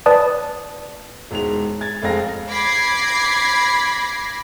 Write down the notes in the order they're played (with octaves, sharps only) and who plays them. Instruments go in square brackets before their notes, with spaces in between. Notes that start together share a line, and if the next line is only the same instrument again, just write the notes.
[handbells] B4 D5 A5 D#6
[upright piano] E1 G#2 F7
G#6 A6
F1 F2 G#3 F5 A#6
[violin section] B5 D6 G#6 A#6 C7